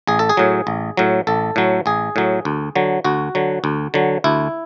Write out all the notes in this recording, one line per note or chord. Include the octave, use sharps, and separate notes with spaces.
A1 G#4
A4
G#4
A2 F#3
A1
A2 F#3
A1 A4
A2 F#3
A1 G#4
A2 F#3
D2
D3 F#3
D2 F#4
D3 F#3
D2
D3 F#3
D2 E4